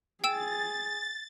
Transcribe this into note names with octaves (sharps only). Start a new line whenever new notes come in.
G#4 G5 E6 A6 E7